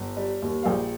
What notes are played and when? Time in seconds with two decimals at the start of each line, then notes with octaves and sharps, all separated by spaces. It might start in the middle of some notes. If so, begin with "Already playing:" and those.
Already playing: G1
0.17 G3
0.42 D#2
0.63 F5
0.66 A#1 G5